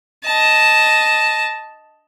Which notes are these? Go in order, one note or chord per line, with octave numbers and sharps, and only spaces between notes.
D#5 A5